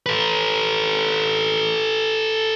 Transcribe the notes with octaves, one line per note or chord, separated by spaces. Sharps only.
A4 B4